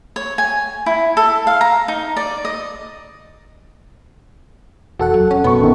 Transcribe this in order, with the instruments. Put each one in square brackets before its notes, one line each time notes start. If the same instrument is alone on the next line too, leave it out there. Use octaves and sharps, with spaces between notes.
[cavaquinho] C#5
G#5
E4
A4
F5
A#5
D#4
D5
D#5
[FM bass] E1 [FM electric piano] F#4 A4 F#5
[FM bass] F#3
C#4
[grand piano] B1 C#6 [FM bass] B3
[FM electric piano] A1 A4 [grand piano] F#2 B2 D#3